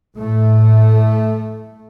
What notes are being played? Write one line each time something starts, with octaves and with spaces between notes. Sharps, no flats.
A2 A3